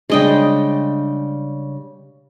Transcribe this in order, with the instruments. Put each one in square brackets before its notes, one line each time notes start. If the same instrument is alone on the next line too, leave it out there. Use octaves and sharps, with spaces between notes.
[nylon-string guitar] C#3 G3 D4 [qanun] G#3 D#5 G5